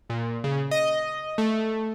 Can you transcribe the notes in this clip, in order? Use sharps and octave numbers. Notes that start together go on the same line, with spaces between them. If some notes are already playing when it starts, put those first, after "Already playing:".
A#2
C#3
D#5
A3